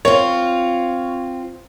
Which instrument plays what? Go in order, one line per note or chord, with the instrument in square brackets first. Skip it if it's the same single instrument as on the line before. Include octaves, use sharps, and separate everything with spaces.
[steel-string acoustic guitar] C4 F4 [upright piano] C#5